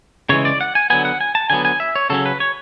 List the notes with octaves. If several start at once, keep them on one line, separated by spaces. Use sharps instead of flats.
C#3 E3 G#3 C#5
D5
F#5
G#5
D3 F#3 B3 G#5
F#5
G#5
A5
D3 F#3 B3 G#5
G#5
E5
C#5
C#3 F#3 C#4 A4
B4
C#5